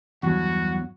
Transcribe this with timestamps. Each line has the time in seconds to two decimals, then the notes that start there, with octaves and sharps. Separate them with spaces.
0.23 E2 G2 F#3 F#4